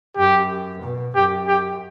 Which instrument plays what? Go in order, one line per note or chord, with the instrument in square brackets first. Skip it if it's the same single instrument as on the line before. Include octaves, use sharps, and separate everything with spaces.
[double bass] F#2 [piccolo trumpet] G4
[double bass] B2
[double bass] F#2 [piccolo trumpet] G4
[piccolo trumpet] G4